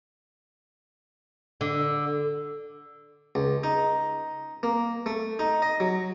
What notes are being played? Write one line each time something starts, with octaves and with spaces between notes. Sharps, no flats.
D3
C#2
D#4
A#3
A3
D#4
D#5
F#3